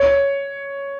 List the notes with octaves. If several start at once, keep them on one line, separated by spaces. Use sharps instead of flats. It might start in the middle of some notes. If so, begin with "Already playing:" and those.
Already playing: C#5